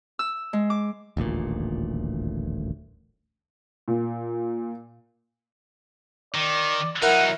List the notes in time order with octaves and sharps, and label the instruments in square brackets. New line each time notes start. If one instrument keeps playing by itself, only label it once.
[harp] E6
G#3
D6
[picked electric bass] D#1 A1 D2 A#2
[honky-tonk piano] A#2
[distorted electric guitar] D#3 [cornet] D5
[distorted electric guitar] F#3 D#4 [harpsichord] E4 A#4 [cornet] F#5